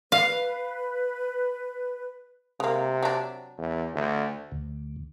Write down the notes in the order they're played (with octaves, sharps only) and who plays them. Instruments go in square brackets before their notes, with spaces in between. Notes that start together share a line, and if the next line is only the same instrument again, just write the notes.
[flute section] B4 [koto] F5
[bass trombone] C3 [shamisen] G#3 A#3
[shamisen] F#3 D4
[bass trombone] E2
D2
[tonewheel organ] D2